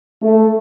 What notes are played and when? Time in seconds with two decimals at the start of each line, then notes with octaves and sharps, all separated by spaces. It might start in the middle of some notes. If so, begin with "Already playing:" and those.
0.22 A3